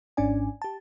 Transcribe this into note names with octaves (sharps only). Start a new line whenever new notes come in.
G#1 G#2 C#4 D4 D5 G#5
G4 A5